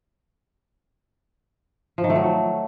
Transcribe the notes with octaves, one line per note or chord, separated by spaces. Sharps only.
F3
D#3
A3
F#3